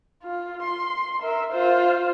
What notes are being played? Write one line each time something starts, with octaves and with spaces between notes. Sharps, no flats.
F4
C6
A#4 E5
F4 C5